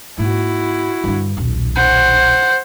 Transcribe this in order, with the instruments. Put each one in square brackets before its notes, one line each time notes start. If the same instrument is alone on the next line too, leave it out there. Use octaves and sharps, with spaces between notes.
[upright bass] G#2 A#3 [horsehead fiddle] E4 F#4
[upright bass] G2 D3
D#1 B1
[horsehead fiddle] C5 F#5